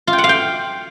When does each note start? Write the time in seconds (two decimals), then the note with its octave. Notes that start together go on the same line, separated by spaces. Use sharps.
0.07 F4
0.13 G5
0.18 F#5
0.24 F5
0.29 G5